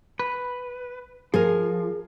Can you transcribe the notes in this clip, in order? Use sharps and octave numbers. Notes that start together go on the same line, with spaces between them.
B4
F3 G#4 A#4